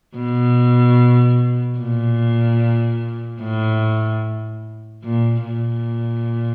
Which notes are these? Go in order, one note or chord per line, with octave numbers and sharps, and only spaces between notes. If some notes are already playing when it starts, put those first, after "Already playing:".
B2
A#2
A2
A#2
A#2